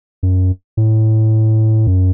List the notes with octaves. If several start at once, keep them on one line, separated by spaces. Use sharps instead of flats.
F#2
A2
F#2